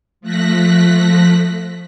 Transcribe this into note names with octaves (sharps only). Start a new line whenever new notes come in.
F3 A3 F#6 A#6 B6